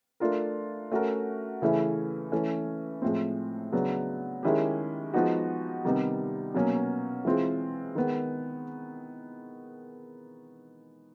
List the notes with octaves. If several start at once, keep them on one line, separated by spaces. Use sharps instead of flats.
A3 D4 F4 A#4
A3 C#4 F#4 A#4
C#3 E3 A3 C#4 E4
E3 A3 C#4
A2 F3 G#3 C4
C#3 F#3 B3 D4
D#3 G#3 C#4 E4 G4
F3 G#3 B3 D#4 F#4
C3 D#3 G3 B3 D#4
B2 F#3 A#3 C#4
E3 G#3 C4 F4
D#3 G#3 B3